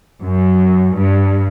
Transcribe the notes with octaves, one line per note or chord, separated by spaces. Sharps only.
F#2
G2